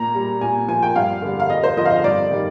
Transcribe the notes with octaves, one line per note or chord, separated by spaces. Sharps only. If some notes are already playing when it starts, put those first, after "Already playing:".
Already playing: A#2 A#5
G3
A#2 G#5
F3 G#5
G5
G2 F5
D3 G3
F5
F2 D#5
C5
D3 F3 D#5
F5
D#5
G2 D5
D#3 G3